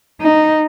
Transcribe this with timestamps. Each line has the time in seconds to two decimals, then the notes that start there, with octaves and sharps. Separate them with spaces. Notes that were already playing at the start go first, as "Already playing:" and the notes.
0.21 D#4